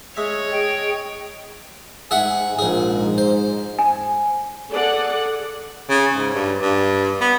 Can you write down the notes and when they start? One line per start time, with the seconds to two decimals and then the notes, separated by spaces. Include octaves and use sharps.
0.17 G#3 C#5 E5
0.52 G#4 D#5 G5
2.11 G#2 G#4 E5 F#5 G#5
2.59 A#1 G#2 G#4
3.18 C5
3.79 G#5
4.71 G#4 A4 D5 F#5
5.90 C#3
6.15 G#2
6.34 G2
6.62 G2
7.21 B3